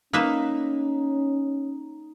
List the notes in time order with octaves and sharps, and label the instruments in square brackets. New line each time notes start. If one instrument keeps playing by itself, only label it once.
[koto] A#3 B4 E5 [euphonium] C#4 [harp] D#4